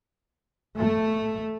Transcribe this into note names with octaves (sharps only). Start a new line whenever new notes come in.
A3